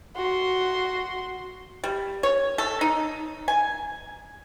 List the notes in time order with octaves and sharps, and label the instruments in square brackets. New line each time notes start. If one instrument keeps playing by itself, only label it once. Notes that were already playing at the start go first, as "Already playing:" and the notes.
[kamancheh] F#4 C6
[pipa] G3
C#5
A4
D#4
G#5